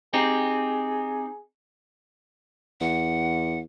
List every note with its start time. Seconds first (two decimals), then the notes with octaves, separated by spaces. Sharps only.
0.14 C4 D#4 G4 G#4
2.81 E2 F#5